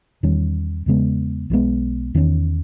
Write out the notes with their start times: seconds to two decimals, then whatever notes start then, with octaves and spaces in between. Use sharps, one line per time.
0.23 E2 D#3 G3 C#4
0.86 E2 C#3 G#3 B3
1.50 B1 A#2 G#3 B3
2.14 E2 D#3 A#3 C#4